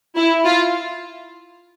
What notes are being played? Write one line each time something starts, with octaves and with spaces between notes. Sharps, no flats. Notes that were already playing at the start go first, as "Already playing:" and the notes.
E4
F4